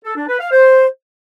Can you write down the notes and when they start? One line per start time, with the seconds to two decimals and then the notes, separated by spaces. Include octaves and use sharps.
0.05 A4
0.17 D4
0.28 B4
0.40 F5
0.52 C5